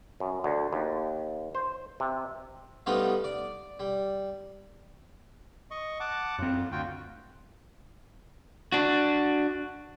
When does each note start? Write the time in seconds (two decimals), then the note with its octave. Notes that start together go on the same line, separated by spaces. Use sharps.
0.20 F#2
0.44 D2
0.73 D#2
1.55 C5
2.00 C3
2.86 F3 G3 A3 B3 D#4 F4
3.24 D5
3.80 G3
5.71 D#5 C#6
6.00 F#5 A5 D6
6.39 F#2 A2 C4 F4
6.72 D2 F4 F#4 G5
8.72 D4 F#4